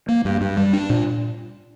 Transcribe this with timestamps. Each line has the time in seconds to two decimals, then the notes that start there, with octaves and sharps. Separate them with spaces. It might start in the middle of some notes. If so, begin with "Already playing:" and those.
0.08 A#3
0.25 G2
0.41 G2
0.57 G3
0.73 D4
0.90 A#2